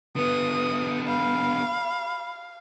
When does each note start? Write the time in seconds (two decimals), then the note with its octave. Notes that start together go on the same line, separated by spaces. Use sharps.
0.16 D3 B3 B4 D#6
1.07 F5 B5